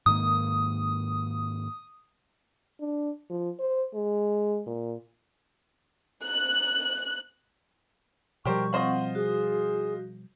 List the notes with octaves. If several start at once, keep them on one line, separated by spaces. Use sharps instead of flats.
G#2 D#3 A#3 D#6
D4
F3
C5
G#3
A#2
F#6
B2 F3 G3 G4 A#4 C5 C#6
C4 F4 C5 D#5 F#5
F#4 G#4